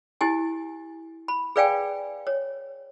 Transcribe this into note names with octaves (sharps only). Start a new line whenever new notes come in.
E4 G4 G#5
B5
G#4 B4 D5 F5 G5 G#5
C#5